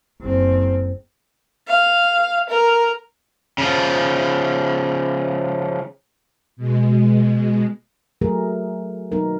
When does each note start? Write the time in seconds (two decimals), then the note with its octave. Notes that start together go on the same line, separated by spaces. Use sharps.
0.20 F#1 C4
1.68 F5
2.49 A#4
3.58 C#3 F3
6.57 B2 G#3
8.21 F#3 A3 G#4 A#4
9.12 F#3 B3 D#4 A#4